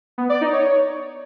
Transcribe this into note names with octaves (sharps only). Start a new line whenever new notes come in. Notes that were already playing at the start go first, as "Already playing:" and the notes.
B3
D5
D#4
C#5